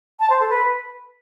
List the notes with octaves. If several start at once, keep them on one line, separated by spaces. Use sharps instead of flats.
A5
C5
A4
B4